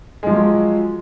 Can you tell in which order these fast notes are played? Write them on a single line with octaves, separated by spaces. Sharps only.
G#3 F3 F#3